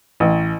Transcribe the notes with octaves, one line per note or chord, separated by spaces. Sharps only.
A1